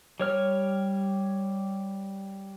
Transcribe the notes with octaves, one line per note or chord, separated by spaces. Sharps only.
G3 C#5 F6